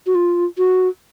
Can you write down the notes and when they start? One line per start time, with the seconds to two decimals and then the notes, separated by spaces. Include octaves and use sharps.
0.06 F#4
0.15 F4
0.58 F#4